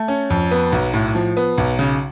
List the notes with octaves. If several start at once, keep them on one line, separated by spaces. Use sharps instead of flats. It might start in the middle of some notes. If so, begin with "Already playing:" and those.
Already playing: A3
C#4
F2
B3
B1
A2
F3
B3
B1
C#3